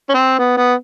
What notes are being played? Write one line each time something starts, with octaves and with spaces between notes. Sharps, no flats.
C#4
C4
B3
B3